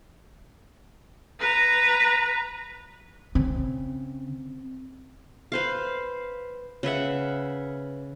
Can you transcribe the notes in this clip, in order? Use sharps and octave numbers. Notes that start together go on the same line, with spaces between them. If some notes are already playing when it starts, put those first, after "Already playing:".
B4 A#5
C#3 C4
B4 C5 F5
C#3 B4 E5 F#5